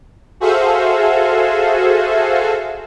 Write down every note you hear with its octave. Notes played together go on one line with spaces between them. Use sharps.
F#4 G#4 A4 C5 E5 F5